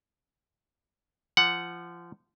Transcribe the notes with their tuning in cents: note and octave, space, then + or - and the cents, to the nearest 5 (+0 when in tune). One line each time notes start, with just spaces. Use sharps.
F3 -25 F#5 +0